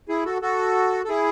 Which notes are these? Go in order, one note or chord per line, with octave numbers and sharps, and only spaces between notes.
E4 G#4
F#4 A4
F#4 A4
A4
E4 G#4